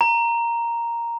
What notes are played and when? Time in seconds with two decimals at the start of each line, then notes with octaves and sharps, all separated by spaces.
0.01 A#5